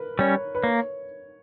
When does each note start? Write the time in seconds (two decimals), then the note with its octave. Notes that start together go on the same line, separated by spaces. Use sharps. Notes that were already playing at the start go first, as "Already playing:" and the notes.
Already playing: A#4 B4
0.19 G3 C#4 C#5
0.55 B4
0.63 A#3 C#5